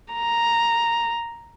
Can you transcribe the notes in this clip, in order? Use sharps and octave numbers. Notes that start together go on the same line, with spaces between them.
A#5